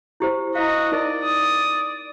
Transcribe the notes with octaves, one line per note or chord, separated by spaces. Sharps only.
E4 G4 C5
E4 F#4 D#5 F5
D#4 A#4 D5 E6
D#6